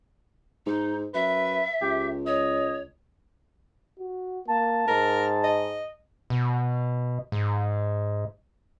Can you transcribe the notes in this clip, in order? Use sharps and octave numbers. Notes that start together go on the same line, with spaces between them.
G#2 D#4
F#2 B4 E5
C#2 G4
C#5 D#5
F#4
A#3 A5
G#2 A#4
D#5
B2
G#2